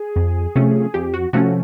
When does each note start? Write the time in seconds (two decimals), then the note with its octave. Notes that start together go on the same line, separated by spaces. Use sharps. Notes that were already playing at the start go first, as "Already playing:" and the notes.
Already playing: G#4
0.16 F2
0.55 C3 F3 A3 C#4
0.94 F2 G4
1.14 F#4
1.33 C3 F3 A3 C#4 F#4